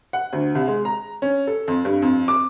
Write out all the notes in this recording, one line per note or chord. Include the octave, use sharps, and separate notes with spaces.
F#5
D2
C2
G#3
A#5
C#4
A4
F2
G2
F2
D6